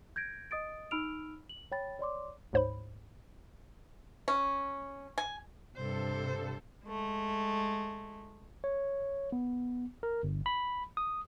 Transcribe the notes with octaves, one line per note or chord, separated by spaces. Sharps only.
G6 G#6 A#6 D7
D#5 D#6 A6 D7
D#4 B5 E6 F6 D7 F7
F#7
C#5 G5 B5 A6
C#5 D5 C6 D6
D2 G#2 C5 C#5 B5
C#4
G#5
G2 C3 A4 C5
G#3 A3
C#5
B3
A#4
G1
B5
D#6